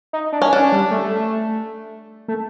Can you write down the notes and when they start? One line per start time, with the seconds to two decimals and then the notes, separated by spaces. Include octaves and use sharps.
0.13 D#4
0.32 D4
0.42 C#4
0.53 C#4 D4
0.72 G3
0.91 A3
2.28 A3